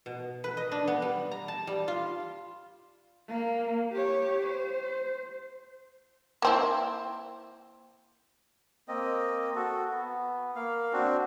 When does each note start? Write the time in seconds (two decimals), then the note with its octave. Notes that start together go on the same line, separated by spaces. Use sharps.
0.06 B2
0.44 B4
0.57 D#5
0.72 D4
0.87 B3
1.02 G3
1.31 A#5
1.48 A5
1.67 G3
1.88 F4
3.29 A#3
3.92 G4 C#5
4.46 C5
6.42 A#3 C4 E4
8.88 A#3 C4 D#5
9.55 F#4 A4
9.91 B3
10.56 A#3 F5
10.93 C4 D4 F#4